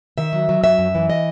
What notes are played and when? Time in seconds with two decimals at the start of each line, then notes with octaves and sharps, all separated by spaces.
0.18 D#3 E5
0.33 F#3
0.49 F#3
0.63 F#2 E5
0.79 F#2
0.95 E3
1.10 D#5